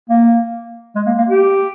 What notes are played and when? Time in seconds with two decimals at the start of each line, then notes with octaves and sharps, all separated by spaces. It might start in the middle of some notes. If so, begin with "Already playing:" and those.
0.09 A#3
0.96 G#3
1.06 A#3
1.18 A#3
1.29 G4